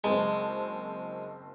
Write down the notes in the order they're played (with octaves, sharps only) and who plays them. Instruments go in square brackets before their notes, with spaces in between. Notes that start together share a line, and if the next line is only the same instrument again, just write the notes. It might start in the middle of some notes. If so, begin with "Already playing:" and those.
[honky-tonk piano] F#1 C4 A5 [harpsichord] G#3